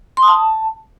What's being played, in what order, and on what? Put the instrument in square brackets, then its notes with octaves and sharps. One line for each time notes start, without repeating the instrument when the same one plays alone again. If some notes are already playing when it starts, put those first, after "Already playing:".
[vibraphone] C6
D#6
A5